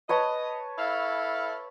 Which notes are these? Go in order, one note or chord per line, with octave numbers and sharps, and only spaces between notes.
B4 C#5 D#5 A5
E4 A4 F5